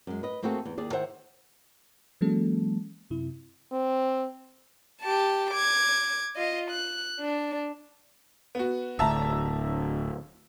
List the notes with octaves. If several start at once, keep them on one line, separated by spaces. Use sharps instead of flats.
F#2 G#3
B4 D#5
A3 A#3 C4 F#4 G#4 A4
E2
D#2 G#4 D5
D#3 C5 E5 F#5
E3 F#3 G#3 A#3 C#4 A4
F#2 C3 E4
C4
G4 A5
D6 G#6
F4 D#5
F#6
D4
B3 F#4
D1 D2 E5 A5 A#5